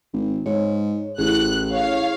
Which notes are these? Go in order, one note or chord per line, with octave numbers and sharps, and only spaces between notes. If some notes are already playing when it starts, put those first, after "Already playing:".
G#1
G#2 C#5
A1 E4 G#4 F#6
C#5 F5